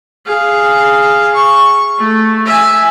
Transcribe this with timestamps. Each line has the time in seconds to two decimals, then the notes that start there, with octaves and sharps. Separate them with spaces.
0.26 G#4 F5
1.34 C#6
1.98 A3
2.46 E5 G#5